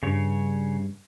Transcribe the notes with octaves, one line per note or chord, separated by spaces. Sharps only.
G2 C#3 C#5